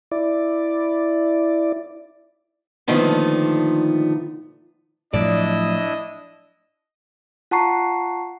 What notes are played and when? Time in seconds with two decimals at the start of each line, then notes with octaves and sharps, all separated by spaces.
0.11 E4 D5
2.88 A#2 D3 D#3 F3 A3 B3
5.14 A2 F3 F#3 D4 E4 D5 D#5 E6
7.51 F4 F#5 A5 A#5 C#6 C7